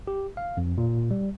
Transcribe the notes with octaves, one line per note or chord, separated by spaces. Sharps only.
G4
F5
F2
A#2
G3